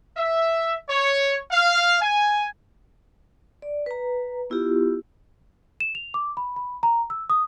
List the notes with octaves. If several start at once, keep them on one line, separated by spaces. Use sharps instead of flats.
E5
C#5
F5
G#5
D5
B4 A#5
B3 E4 F4 G4
E7
F7
D6
B5
B5
A#5
E6
D#6